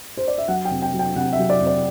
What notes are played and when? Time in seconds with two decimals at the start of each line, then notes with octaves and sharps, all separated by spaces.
0.17 C5
0.28 D5
0.38 E5
0.48 F#3 F#5
0.65 G5
0.71 C3
0.82 G5
0.94 F#3
0.99 G5
1.16 C3 F#5
1.33 E5
1.39 F#3
1.50 D5
1.61 C3
1.67 D5